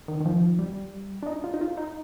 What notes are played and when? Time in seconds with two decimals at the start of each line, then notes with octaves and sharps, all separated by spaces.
0.08 D#3
0.20 D#3
0.25 F3
0.59 G3
1.23 D4
1.26 D#4
1.44 F4
1.54 D#4
1.61 F4
1.77 D#4